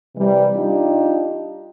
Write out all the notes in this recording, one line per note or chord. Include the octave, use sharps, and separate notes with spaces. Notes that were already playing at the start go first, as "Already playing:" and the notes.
C3 E3 G3
D4 D#4 F4 G4